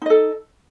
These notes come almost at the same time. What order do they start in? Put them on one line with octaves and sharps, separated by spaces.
D#4 D#5 A4